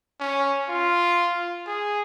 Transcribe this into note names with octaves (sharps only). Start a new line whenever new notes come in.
C#4
F4
G#4